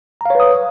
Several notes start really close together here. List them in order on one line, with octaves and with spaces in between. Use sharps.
A#5 F5 C#5 B4 D#6